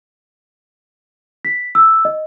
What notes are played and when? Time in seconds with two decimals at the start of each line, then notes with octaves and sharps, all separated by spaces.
1.45 B6
1.75 E6
2.05 D#5